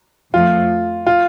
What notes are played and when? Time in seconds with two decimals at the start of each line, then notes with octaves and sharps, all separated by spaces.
0.33 F2 F3 A3 F4
1.07 F4